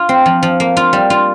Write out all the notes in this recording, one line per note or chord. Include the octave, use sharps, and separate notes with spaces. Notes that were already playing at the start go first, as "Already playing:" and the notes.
Already playing: F4
C4
F3
F3
A#3
F4
G3
F4